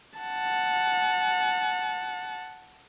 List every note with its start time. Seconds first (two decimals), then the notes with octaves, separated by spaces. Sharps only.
0.19 F#5 A5